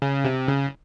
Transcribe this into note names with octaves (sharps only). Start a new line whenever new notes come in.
C#3
C3
C#3